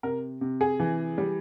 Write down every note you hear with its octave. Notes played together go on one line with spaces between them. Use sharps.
C3 A#4
C3
G#4
E3
G3